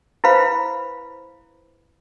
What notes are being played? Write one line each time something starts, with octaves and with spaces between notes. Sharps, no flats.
E4 B4 C5 F5 B5